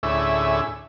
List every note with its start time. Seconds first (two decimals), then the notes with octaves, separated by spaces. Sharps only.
0.03 D2 A2 C#4 E4 G#4 E5